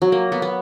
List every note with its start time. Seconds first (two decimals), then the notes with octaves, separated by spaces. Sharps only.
0.02 F#3
0.12 A#3
0.32 B3
0.42 B3